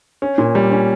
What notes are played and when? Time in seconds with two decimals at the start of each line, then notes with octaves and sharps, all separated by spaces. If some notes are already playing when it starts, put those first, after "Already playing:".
0.22 C#4
0.38 A#2
0.55 G3
0.72 C#4